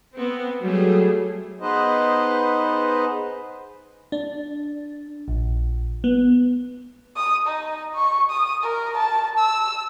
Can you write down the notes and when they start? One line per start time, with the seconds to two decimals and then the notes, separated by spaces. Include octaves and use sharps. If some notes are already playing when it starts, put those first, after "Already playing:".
0.13 B3 C4
0.62 F#3 G3 A3 G#4
1.60 B3 D#4 G#4 B4 C5 D#5
4.12 D4
5.28 A#1
6.04 B3
7.16 D#6
7.47 D#4
7.95 C#6
8.31 D#6
8.63 A#4
8.98 A5
9.39 E6